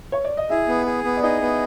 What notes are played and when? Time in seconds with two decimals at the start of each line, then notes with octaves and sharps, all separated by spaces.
0.12 C#5
0.24 D5
0.37 D#5
0.49 E4 G#4 E5
0.68 B3
0.86 G#4
1.04 B3
1.17 D5
1.23 D#4 G#4 D#5
1.42 B3